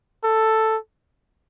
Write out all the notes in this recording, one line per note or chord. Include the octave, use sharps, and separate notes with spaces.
A4